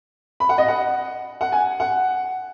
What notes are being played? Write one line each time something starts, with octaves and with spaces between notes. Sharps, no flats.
B5
F#5
D#5
F#5
F#5
G#5
F#5